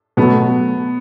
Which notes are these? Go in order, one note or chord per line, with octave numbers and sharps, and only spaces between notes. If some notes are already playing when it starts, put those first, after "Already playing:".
B2 F#3 A3 B3